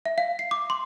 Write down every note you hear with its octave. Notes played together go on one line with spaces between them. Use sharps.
E5
F5
C7
D6
C6